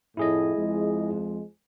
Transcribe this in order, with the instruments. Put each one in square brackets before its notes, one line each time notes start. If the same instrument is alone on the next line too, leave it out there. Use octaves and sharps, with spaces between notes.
[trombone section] F2 A2 [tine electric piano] E4 G#4 D#5
[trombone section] F2 G#3